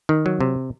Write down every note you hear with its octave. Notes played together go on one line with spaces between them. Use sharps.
D#3
F#3
C3